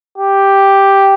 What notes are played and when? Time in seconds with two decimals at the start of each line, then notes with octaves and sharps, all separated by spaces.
0.18 G4